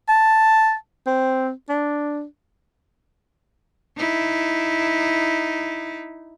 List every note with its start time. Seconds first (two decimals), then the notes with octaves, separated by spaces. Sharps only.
0.09 A5
1.06 C4
1.69 D4
3.97 D#4 E4